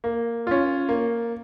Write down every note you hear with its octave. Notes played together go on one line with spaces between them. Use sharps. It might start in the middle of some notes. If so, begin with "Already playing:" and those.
A#3
C#4 F4
A#3